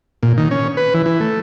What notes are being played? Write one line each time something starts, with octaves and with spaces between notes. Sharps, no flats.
A#2
D#3
C#4
B4
E3
E3
A3